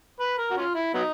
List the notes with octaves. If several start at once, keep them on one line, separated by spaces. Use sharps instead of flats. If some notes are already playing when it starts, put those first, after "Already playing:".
B4
A#4
F#4
C#4 F4
E4
F#3 B3 D#4